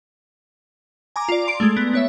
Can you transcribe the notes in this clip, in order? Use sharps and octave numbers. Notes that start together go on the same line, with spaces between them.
G#5 A#5 D6
F4 D5
C6 D7
G#3 A3
B3
B3 C#5 E5